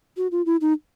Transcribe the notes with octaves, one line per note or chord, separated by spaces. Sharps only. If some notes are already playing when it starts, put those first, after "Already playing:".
F#4
F4
E4
D#4